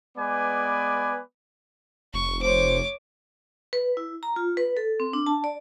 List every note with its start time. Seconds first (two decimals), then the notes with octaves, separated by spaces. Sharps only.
0.17 G#3 B3 B4 D5 G#5 D6
2.14 F1 C#6
2.43 C5 C#5 D6
3.73 B4
3.97 E4
4.23 A#5
4.36 F4
4.57 B4
4.77 A4
5.00 C4
5.13 D4
5.26 A5
5.44 D5